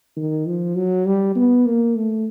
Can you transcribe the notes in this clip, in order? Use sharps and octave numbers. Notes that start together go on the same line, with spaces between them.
D#3
F3
F#3
G3
B3
A#3
A3